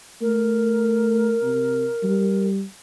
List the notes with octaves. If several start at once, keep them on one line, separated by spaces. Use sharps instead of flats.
A3 A#4
C3
G3